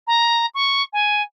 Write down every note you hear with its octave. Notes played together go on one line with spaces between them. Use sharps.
A#5
C#6
G#5